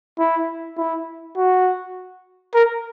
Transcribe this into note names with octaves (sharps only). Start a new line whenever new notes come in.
E4
E4
F#4
A#4